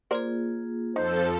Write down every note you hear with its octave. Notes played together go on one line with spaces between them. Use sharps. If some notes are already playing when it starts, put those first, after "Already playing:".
A#3 F4 G#4 A#4 C5 D5
F2 F3 D#4 A4 C5